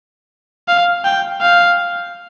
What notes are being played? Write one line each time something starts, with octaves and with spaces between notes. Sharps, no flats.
F5
G5
F5